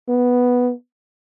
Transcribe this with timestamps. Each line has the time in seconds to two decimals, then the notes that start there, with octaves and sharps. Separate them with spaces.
0.09 B3